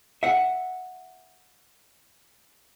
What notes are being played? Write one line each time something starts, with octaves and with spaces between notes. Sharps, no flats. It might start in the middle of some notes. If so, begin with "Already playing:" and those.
E5 F#5